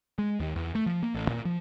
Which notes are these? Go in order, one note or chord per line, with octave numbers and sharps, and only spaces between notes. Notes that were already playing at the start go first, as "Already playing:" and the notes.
G#3
D#2
E2
A3
F3
A#3
A1
A#2
F3